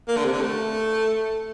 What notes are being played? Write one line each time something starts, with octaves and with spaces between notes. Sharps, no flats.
A#3
D3
C3
D3
A3